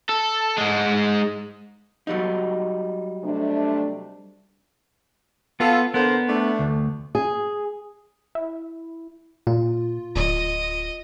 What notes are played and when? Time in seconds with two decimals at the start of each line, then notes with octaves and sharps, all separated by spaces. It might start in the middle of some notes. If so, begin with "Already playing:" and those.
0.09 A4
0.58 G#2 G#3
2.07 F#3 G3 D#4
3.24 C3 A3 D4
5.60 B3 F4 A4
5.94 D3 B3 A#4 C5
6.28 A3 D4
6.59 D2
7.15 G#4
8.35 E4
9.47 A#2 F4
10.16 D1 D#5